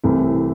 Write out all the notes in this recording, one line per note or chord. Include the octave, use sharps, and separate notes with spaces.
C2 C3 E3 A3 E4